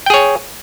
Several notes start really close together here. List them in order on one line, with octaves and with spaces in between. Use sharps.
G5 G#4 C#5